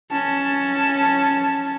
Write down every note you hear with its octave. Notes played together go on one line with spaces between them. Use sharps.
C#4 A5